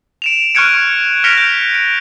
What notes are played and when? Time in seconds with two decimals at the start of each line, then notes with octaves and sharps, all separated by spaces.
0.22 D7 E7 F7
0.55 C#6 F6 F#6 G#6 C#7 D7
1.24 F6 A#6 B6 C#7 D7 F7
1.37 G6
1.74 D7